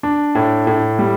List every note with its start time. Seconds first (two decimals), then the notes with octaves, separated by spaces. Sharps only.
0.03 D4
0.35 A2
0.67 A2
0.99 G3